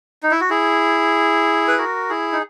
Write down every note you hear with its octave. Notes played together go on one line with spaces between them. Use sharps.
D#4
E4
F#4
E4 G#4
B4
F#4 A#4
E4 G#4
D#4